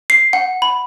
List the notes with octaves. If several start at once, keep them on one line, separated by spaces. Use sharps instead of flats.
C7
F#5
B5